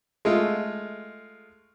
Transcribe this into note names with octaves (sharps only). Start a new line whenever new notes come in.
G#3 A3 F4